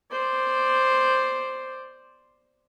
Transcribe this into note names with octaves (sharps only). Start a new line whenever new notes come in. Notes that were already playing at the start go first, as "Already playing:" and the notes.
C5 D5